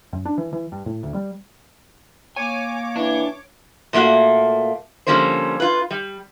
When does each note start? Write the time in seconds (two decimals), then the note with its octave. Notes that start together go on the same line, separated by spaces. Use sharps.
0.13 F#2
0.25 D4
0.38 E3
0.53 E3
0.72 G2
0.86 A2
1.03 D2
1.14 G3
2.36 A#3 C#5 G#5 D6
2.96 E3 D4
3.93 A#2 A3 A#3 F#4
5.07 D3 F3 G3 A#3 C#4 C5
5.60 F4 B4
5.91 G3